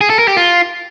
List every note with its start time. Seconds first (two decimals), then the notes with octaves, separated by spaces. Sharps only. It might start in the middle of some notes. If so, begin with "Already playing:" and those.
0.01 G#4
0.10 A4
0.19 A#4
0.28 G4
0.37 F4